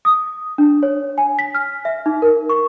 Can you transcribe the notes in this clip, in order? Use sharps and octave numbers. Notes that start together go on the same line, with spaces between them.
D#6
D4
C#5
G#5
B6
F6
E5
D#4
A#4
C#6